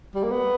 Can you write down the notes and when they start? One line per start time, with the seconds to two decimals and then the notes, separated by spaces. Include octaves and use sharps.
0.15 G3
0.24 A#3
0.31 B3